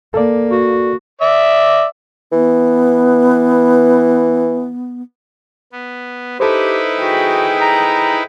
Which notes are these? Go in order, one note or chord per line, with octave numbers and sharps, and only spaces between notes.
A#3 A4 D5
F#4
D5 E5
E3 B3
B3
D#4 E4 G4 A4 B4 C5
F#4 G#4 G5
A#5